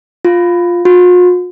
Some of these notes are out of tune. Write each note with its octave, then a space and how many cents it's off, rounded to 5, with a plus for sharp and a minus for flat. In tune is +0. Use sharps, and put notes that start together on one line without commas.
F4 +5
F4 +45